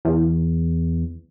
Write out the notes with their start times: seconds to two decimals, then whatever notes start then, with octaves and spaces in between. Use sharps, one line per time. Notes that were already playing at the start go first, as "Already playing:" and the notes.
0.05 E2